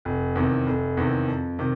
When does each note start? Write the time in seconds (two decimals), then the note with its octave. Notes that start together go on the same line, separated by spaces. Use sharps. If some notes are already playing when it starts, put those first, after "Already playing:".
0.05 F1
0.35 E2 C3 D#3
0.67 F1
0.97 E2 C3 D#3
1.28 F2
1.59 C3 D#3